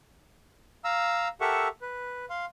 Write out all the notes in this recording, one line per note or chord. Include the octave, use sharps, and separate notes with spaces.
F5 A#5 E6
G4 A4 A#4 E5 F#5 C#6
B4
F5 C6